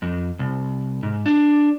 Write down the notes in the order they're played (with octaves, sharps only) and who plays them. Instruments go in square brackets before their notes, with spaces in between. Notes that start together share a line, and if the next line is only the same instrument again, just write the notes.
[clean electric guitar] F2
C2
G#2
D4